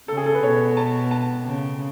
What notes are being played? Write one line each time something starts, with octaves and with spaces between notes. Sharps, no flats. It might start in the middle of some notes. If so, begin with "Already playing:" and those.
C#3 A4
G#4
A4
B4
B2 C#5
A5
A5
C#3